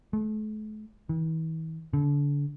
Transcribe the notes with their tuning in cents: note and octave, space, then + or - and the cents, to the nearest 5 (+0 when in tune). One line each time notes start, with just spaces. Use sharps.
A3 -40
E3 -45
D3 -35